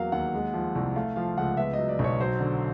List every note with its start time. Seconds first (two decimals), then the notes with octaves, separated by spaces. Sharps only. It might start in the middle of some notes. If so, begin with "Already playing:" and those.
Already playing: E2 F#3 A#3 F5
0.12 D#2 F#5
0.34 G#3
0.54 F3
0.75 C2
0.96 A3 F5
1.16 F3 F5
1.37 C#2 F#5
1.57 B3 E5
1.73 F#3 D#5
1.89 D5
1.99 B1
2.04 C#5
2.20 F#3 C5
2.40 D3